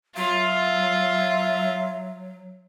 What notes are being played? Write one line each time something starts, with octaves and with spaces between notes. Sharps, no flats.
F#3 F4 E5